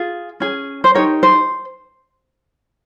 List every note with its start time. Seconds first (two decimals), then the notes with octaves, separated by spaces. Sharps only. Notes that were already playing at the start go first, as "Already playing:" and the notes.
Already playing: F4 G#4
0.40 C#4 G#4
0.84 C5
0.95 D#4 G4 A#4 C#5
1.23 C5